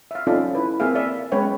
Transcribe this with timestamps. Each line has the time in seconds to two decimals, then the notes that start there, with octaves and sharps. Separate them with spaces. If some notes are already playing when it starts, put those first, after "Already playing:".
0.11 E5 F5
0.27 C#4 D#4 F4 A4 D5 E5
0.55 E4 B4
0.80 A#3 C4 G#4 E5 F5
0.94 G#4 D5 E5
1.32 G#3 B3 C#4 B4 C#5 G5